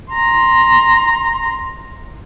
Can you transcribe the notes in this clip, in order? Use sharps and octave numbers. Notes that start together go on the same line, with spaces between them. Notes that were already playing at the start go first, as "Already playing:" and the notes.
A#5 C6